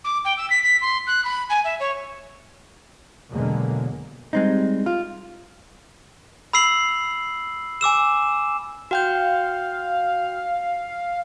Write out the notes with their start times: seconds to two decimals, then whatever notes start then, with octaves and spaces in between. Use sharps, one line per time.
0.04 D6
0.24 G5
0.37 E6
0.50 B6
0.63 B6
0.81 C6
1.07 F#6
1.24 B5
1.49 G#5
1.64 E5
1.79 C#5
3.31 E2 B2 D3 F#3 G#3 A#3
4.33 G3 G#3 C4 D#4
4.86 F4
6.53 B5 E6 C7 F#7
7.81 G#5 D6 E6 E7
8.91 F#4 F5 G5 G6